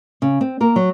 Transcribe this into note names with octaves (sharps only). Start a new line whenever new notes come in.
C#3
C4
A#3 A#4
F#3